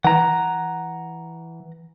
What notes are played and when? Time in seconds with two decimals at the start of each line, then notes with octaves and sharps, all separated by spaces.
0.04 E3 F#5 A#5